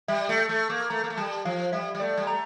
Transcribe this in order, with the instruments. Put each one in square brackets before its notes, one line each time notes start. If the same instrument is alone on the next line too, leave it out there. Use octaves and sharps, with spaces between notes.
[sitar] G3 [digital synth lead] E5
[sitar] A3
[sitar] A3 [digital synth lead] C#6
[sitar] A#3
[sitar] A3 [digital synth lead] A#5
[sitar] A#3
A3
[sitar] G3 [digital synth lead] A5
[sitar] F3 [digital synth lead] F5
[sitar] G3 [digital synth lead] E5
[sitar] G3
[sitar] A3 [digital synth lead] D5
[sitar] G3
[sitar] A3 [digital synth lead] A#5